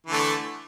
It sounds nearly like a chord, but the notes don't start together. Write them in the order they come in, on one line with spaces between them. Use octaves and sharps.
E3 D3 A3